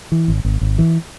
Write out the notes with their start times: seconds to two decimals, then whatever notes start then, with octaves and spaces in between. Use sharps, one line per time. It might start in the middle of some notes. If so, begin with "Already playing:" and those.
0.12 E3
0.28 G#1
0.45 G#1
0.61 G#1
0.78 E3